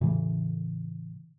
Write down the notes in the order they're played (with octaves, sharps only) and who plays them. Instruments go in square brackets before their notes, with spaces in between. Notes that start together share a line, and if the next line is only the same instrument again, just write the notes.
[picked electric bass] A2 C#3 E3